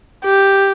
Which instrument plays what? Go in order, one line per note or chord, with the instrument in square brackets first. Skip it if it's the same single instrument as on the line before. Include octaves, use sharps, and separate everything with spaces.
[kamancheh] G4